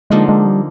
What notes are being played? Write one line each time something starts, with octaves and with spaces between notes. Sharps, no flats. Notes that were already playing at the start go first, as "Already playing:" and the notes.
D3 F3 G#3 A#3 D#4
G#3
G3